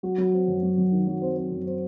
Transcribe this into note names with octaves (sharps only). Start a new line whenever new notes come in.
F#3 F#4
F#3
C4
F#2
F#3
F#2
D#3
F#3
C4
C4
F#2
C4